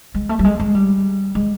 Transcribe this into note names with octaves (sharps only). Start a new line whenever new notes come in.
G#3
A3
G3
G#3
G#3
G3
G#3